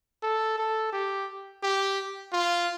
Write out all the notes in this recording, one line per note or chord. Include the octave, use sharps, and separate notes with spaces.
A4
A4
G4
G4
F4